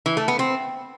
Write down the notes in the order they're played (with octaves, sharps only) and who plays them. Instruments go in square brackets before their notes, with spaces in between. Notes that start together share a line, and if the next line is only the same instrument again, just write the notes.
[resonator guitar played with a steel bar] E3
A3
B3
C4